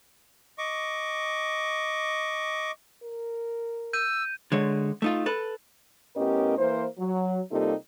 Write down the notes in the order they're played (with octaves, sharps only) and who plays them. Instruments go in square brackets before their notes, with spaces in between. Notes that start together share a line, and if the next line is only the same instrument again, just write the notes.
[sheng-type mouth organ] D#5 C#6 D6
[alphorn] A#4
[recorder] E6 [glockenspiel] G6 D#7
[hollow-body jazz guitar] D3 G#3 C#5
A3 D#4 F4
A4 B4
[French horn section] A2 B3 C#4 G4 A#4 D#5
E3 A#3 E4 B4 C5
F#3
C3 G3 A#3 D#4 F4 A4